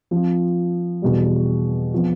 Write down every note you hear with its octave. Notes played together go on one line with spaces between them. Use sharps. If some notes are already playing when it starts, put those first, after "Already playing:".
F3 C4 F4
E2 B2 G3
F3 B3